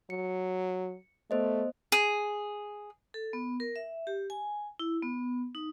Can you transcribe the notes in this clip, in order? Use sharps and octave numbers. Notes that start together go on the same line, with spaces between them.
F#3 C#7
A3 B3 C5 D#5
G#4
A4
B3
A#4
E5
G4
G#5
E4
B3
D#4